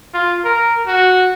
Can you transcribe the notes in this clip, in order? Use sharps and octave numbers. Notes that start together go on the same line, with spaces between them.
F4
A#4
F#4